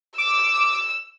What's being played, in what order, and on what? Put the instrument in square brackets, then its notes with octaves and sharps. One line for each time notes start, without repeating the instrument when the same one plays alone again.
[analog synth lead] D6 [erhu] E6